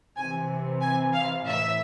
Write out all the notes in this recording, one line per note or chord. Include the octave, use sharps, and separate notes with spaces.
C3 E3 G#5
G#5
F5
A2 E3 E5